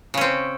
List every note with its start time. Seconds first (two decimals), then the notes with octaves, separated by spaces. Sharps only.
0.14 C#3
0.17 C#4
0.21 C4